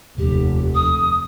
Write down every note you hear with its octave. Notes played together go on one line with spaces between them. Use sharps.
F1 D#2 G4
D#6